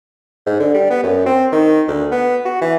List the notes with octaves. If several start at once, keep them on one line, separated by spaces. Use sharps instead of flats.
G#2
D3
G3
B3
F#2
C4
D#3
D2
B3
F#4
E3